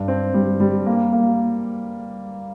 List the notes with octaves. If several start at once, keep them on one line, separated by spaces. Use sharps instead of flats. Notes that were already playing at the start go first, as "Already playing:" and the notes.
Already playing: G2
C4
G3
G3
A#3
A#3